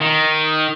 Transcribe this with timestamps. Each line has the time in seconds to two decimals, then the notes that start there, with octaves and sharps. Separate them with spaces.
0.01 D#3